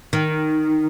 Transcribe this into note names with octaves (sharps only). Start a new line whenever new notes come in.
D#3